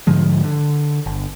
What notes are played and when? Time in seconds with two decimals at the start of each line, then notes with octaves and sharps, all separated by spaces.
0.07 G#2 D3 F3 G#3
0.44 D3
1.06 G1